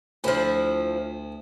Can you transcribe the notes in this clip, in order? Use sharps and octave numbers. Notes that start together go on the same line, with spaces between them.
D2 F3 E4